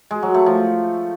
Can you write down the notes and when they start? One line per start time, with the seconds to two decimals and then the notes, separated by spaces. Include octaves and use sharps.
0.11 G#3
0.23 F#3
0.34 A3
0.46 F3